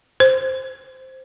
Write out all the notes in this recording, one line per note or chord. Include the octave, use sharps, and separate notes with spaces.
C5